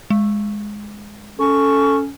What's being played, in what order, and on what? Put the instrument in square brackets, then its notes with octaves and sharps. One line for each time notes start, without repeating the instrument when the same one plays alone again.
[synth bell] G#3
[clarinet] C#4 [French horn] A4 [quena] C#6